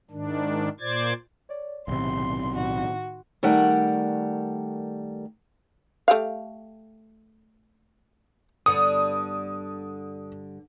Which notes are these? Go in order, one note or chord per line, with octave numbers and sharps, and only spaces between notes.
G#2 D#3 D4
A#2 C5 D5 G#6 A6
C#5 D5
B1 A2 C3 D#3 C6
A2 D#3 D#4 F#4
D#3 G3 A3 A#4 F#5
A3 G4 F5
G2 D3 B3 D#6